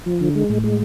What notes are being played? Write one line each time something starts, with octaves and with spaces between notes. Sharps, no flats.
F3
D3
G#3
A2
G#3